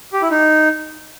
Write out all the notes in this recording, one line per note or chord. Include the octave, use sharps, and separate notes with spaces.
G4
E4
D#4